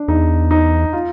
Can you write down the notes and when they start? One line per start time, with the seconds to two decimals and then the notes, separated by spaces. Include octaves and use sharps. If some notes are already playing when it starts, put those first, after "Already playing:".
Already playing: D4
0.08 E2 D#4
0.51 D#4
0.93 F4